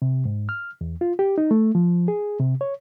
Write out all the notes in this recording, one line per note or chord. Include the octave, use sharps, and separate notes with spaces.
C3
G#2
F6
E2
F4
G4
D#4
A3
F3
G#4
C3
C#5